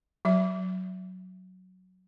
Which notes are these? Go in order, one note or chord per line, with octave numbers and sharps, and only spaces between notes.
F#3 E5